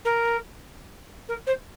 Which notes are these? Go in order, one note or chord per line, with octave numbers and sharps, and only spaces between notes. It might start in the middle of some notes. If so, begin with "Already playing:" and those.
A#4
A#4
C5